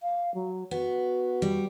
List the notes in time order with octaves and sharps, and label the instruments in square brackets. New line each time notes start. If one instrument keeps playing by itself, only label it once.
[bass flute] F5
F#3
[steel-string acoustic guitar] B3 [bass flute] F#4
[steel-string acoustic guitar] G3